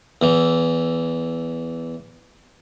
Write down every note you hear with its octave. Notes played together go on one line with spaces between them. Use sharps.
E2 E3